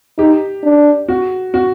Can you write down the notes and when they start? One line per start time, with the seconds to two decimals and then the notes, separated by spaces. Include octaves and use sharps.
0.18 D#4 G4
0.63 D4
1.08 F#4
1.54 F#4